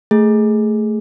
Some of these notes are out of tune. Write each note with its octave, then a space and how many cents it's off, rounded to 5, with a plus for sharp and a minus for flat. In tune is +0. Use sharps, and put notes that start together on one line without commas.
A3 +0 G#4 +0